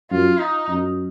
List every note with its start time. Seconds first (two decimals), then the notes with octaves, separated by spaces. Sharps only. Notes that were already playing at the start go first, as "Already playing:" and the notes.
0.11 F#2 F4
0.39 D#4
0.69 F#2